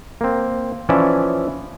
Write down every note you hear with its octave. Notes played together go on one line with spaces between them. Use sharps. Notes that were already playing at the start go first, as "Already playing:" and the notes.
A#3 C4
E3 F3 C#4 D5 E5